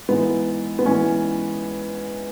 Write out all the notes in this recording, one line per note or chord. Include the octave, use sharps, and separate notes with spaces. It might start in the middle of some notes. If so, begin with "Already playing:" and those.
G#2 E3 B3
B3
G#2 E3 C#4